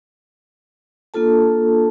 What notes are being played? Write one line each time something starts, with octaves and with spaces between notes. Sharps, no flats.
A#3 D4 F4 A4 A5